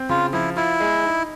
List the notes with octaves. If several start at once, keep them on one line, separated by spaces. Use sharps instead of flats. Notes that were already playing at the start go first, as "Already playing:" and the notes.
Already playing: C4
C#3 F4
F3 E4
E4 F4
G#3
D#4